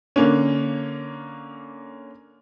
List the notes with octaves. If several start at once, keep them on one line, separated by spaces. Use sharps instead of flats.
D3 A#3 C#4